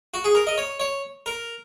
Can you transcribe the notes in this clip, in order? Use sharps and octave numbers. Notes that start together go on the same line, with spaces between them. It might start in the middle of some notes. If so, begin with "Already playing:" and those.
F#4
G#4
A#4
D#5
C#5
C#5
A#4